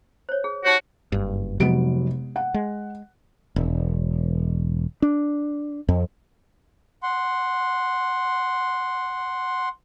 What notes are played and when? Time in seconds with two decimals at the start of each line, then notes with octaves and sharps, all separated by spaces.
0.29 C5 C#5
0.44 G#4
0.65 D#4 F#4 G4 C#5
1.12 F#1 G2
1.60 F1 C3 F#3 G#3 B3 D7
2.36 F#5
2.54 G#3
3.56 E1
5.02 D4
5.89 F2
7.03 F#5 C6